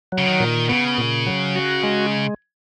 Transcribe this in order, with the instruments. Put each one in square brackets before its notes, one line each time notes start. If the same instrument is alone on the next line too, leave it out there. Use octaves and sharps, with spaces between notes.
[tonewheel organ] F#3
[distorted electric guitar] C#3
D#3
[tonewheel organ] A#2
[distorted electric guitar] C#3 [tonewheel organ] B3
[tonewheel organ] A#2
F#3
F#4
G#3